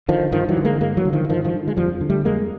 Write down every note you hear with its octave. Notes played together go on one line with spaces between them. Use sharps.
D3 D#3 F3
G2 D#3 F3
E3 F#3
D3
G#3 A#3
G2 G#3 A#3
E3 F#3
D3
D#3 F3
E3
G2 D#3 F3
D#3 F3
D3
G#3
F2 F3 G3
D3
G3 A3
F2 G#3 A#3